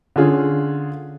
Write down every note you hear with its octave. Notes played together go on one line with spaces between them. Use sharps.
D3 C#4 F4 G#4